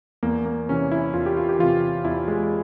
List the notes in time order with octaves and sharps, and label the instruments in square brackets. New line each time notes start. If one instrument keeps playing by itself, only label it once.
[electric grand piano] E2 A#3
A#3
C3 E3 C#4
E4
E2 F4
G4
F4
G4
C3 E3 F4
E2 E4
G#3